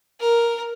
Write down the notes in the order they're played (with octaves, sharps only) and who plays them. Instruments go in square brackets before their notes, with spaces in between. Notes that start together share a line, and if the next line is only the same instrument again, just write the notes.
[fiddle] A#4